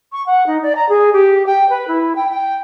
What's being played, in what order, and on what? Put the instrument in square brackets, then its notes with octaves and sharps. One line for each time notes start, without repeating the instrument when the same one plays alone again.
[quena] C#6
F#5
D#4
D5
A#5
G#4
G4
G5
B4
E4
G5
G5